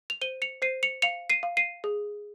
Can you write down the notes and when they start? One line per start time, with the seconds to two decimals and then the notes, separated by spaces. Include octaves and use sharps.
0.10 F7
0.21 C5 D#7 G7
0.42 C#7 F7
0.62 C5 C7 D#7
0.83 C#7 F7
1.02 F5 C#7 F7
1.30 C7 D#7
1.43 F5
1.57 C7 D#7
1.84 G#4